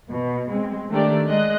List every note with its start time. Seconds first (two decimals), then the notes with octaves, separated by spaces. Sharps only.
0.12 B2
0.50 G#3 C4
0.90 D#3 A3 D4 G4 A#4 D5
1.26 G#3 D#5 F#6